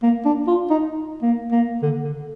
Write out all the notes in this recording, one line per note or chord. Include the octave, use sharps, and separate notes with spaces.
A#3
D4
F4
D#4
A#3
A#3
D3
D3